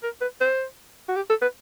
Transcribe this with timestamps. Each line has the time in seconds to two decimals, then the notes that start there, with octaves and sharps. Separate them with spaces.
0.03 A#4
0.21 B4
0.41 C5
1.08 F#4
1.16 G4
1.29 A4
1.42 B4